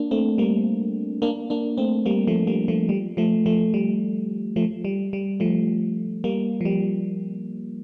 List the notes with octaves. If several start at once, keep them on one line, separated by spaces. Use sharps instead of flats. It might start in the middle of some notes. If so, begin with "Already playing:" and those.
Already playing: A#3 D4
A3 C4
G3 A#3
A#3 D4
A#3 D4
A3 C4
G3 A#3
F3 A3
G3 A#3
F3 A3
G3
F3 A3
F3 A3
G3
F3 A3
G3
G3
F3 A3
G3 A#3
F3
G3